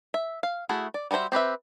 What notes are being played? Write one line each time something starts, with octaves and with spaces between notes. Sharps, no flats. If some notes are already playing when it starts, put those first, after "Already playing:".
E5
F5
A3 E4 F#4 G#4
D5
G3 F#4 A#4 C5 E5
C4 G4 B4 E5